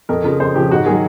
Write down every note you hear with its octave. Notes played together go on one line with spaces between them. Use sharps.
F2 A#4
C#3 F3 A#4
F2 C5
C#3 F3 G4
G#2 F#4
D#3 F#3 G#4